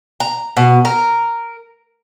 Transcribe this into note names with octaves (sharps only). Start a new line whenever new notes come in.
A#5
B2
A#4